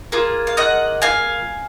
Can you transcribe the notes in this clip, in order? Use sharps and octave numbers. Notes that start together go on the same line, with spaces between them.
A#3 F4 G#4
F5
D#5 F#5
F5 G#5